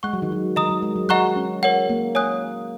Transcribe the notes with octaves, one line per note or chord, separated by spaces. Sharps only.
G#3 F#5 C#6 F#6
F#3
D#3
F#3
D#3 D#5 A#5 D#6
F#3
G#3
F#3
F#3 D#5 F#5 A#5 C#6 F#6
C#4
A#4 C#5 F#5
A#3
C#5 G#5 D#6 F#6